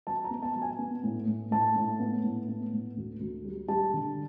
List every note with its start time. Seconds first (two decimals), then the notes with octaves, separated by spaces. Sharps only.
0.07 F#3 A5
0.24 A#5
0.31 B3
0.42 A5
0.56 F#3
0.62 G#5
0.79 B3
1.04 A2
1.27 A2
1.51 A2 A5
1.76 A2
2.00 B3
2.24 A2
2.48 B3
2.73 A2
2.97 D2
3.20 D2
3.45 G3
3.68 G3 A5
3.94 D3